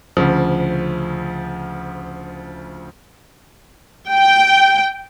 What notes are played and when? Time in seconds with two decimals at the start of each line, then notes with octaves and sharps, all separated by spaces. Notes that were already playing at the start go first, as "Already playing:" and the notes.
0.17 D2 C#3 F3
4.10 G5